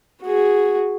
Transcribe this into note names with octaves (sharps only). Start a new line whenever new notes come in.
F#4 G#4